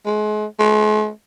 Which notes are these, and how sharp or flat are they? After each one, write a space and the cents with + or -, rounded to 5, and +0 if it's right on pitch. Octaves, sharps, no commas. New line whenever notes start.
G#3 +35
G#3 +45